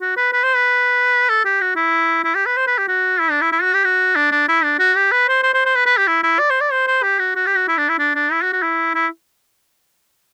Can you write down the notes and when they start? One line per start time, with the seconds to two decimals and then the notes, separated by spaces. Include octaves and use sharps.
0.02 F#4
0.17 B4
0.33 B4
0.44 C5
0.55 B4
1.29 A4
1.45 G4
1.61 F#4
1.76 E4
2.24 E4
2.35 G4
2.46 B4
2.57 C5
2.67 B4
2.78 G4
2.88 F#4
3.21 E4
3.31 D4
3.41 E4
3.52 E4
3.62 F#4
3.74 G4
3.85 F#4
4.16 D4
4.32 D4
4.48 E4
4.63 D4
4.79 F#4
4.96 G4
5.12 B4
5.28 C5
5.43 C5
5.54 C5
5.66 C5
5.76 B4
5.86 B4
5.98 G4
6.07 E4
6.23 E4
6.39 D5
6.50 C5
6.61 D5
6.72 C5
6.88 C5
7.03 G4
7.19 F#4
7.36 F#4
7.47 G4
7.56 F#4
7.68 E4
7.78 D4
7.89 E4
7.99 D4
8.15 D4
8.32 E4
8.42 F#4
8.53 F#4
8.63 E4
8.95 E4